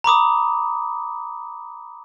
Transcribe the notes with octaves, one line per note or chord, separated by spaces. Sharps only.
A#5 B5 D6 D#6